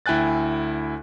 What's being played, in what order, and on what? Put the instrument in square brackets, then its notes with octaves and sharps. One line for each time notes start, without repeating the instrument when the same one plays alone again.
[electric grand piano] D2 E4 G5 G#5 F#6 A6